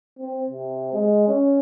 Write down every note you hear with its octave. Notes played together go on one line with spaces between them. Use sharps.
C4
C3
G#3
C#4